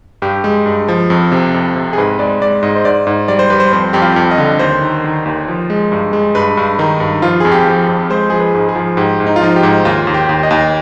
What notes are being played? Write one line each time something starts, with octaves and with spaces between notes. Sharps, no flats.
G2 G4
G#3
G2
F3
F2
C3
F2
C3
G#4
G#2 B4
G#3 D5
G#3 D5
G#2 D#5
C5
G#2 D5
G#2
G3 D5
C5
G3 B4
C5
F2 C5
F2 G4
F4
F2
D#5
D3
D#2 C5
D#3
D#3
D#2
F3
G#3
G2
G#3
G2 B4
G2
D#3 D#4
G2
F3 F4
F2 G#4
G4
F3
F2
G#3 C5
F3 G#4
B4
G#2
G#4
F3
G#2 G4
G#2
D#4
F4
F3 D#4
G4
G#2
D#2 F4
D#2
G4
D#2
D#5
D#2